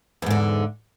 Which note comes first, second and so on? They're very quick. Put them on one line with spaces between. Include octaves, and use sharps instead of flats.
E2 G#2 D3